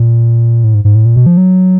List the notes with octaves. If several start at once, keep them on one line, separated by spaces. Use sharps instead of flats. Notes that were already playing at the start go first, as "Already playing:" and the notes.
Already playing: A#2
A2
G#2
G#2
A2
A#2
B2
F3
F#3